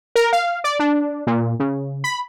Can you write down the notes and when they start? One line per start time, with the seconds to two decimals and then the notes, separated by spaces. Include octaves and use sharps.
0.16 A#4
0.33 F5
0.64 D5
0.79 D4
1.27 A#2
1.60 C#3
2.04 B5